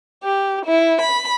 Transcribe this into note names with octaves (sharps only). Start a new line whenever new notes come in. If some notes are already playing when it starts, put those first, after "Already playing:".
G4
E4
B5